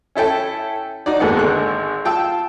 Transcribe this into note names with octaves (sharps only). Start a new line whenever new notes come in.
C#4 E4 A4 G5
D#4 F#4 D5
D#2 G#2 B3 A4 F#5
G#1 D3 F#6
F4 G5 A5 E6